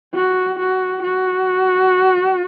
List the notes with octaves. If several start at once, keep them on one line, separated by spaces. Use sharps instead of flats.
F#4
F#4
F#4